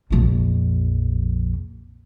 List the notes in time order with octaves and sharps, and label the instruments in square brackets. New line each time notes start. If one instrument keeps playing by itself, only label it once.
[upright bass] A#1 F2